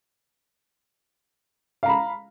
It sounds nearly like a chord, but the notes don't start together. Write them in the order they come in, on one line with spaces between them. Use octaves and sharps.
F5 A#5 B5